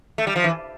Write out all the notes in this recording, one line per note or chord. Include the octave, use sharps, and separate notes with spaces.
A3
G3
F3
E3